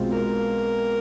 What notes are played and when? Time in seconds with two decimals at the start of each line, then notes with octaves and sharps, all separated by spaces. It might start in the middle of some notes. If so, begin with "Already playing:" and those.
Already playing: B1 B2 G#3 C4 F4
0.11 A#4